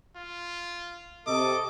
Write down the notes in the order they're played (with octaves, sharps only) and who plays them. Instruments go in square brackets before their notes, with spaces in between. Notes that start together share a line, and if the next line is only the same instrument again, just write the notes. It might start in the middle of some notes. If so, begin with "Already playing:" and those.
[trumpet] F4
[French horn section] C3 [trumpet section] A4 D#5 [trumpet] D6